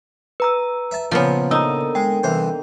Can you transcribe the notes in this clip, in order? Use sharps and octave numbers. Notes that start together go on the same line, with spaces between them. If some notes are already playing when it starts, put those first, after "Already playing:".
B4 A#5 E6
E5 A5
A#2 C#3 F3 A#3 B3
D3 D#3 D#4 A#5 D#6 E6
G#3 G5
C2 E3 C5